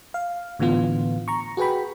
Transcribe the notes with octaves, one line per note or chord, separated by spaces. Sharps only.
F5
A2 D3 E3 B3 F4
A#5 C#6
F#4 G#4 B4 G5 B5